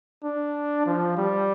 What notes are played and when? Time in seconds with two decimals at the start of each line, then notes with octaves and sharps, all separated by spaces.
0.24 D4
0.86 F3
1.17 G3